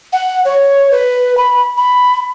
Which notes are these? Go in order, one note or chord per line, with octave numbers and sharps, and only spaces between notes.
F#5
C#5
B4
B5
B5